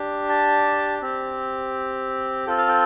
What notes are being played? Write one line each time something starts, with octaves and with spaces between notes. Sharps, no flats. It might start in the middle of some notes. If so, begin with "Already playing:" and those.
Already playing: D4 G4
A5
C4 G4
C4 F4 A4 G5
F5
G5